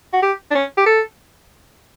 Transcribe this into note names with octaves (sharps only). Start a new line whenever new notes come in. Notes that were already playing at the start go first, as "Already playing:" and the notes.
F#4
G4
D4
C#4
G4
A4